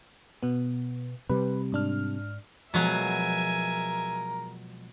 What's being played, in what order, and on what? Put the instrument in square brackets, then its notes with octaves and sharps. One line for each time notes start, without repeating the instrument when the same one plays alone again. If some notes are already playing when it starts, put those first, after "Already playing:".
[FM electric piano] B2 B3
[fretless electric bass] C3 G3 [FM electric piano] B4
[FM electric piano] G#2 D4 F6
[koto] B2 F#3 [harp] F3 G#3 B3 [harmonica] A#4 [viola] E5 G#5